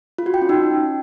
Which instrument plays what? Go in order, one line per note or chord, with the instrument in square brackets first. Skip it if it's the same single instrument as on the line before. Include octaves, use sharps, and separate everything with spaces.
[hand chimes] F4
F#4
G5
C#4
D#4